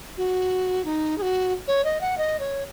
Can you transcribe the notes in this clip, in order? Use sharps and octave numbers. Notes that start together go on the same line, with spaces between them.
F#4
D#4
G#4
F#4
C#5
D#5
F#5
D#5
C#5